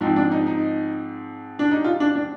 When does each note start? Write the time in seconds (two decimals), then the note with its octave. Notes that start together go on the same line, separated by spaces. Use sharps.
0.01 G#2 F3 C4 D#4
0.16 D4
0.31 D#4
0.46 D#4
1.59 D4
1.71 D#4
1.84 F4
2.00 D4
2.15 D4